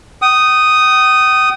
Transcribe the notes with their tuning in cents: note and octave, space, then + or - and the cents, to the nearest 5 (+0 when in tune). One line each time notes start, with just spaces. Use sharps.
G5 -40 D#6 +0